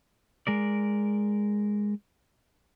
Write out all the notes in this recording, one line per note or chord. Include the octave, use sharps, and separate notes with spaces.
G#3 A#4 D5